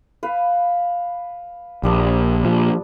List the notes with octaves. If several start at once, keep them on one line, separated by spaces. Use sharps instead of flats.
B4 F5 B5
A#1 G3 D4 D#6
A#2 F3